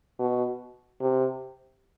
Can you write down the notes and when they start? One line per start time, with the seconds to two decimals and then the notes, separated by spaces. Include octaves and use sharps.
0.19 B2
1.01 C3